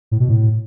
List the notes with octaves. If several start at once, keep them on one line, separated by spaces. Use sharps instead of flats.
A2
B2
A2